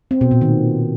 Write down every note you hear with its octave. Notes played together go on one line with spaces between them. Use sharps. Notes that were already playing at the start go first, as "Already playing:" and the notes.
C4
B2
A#2
D#3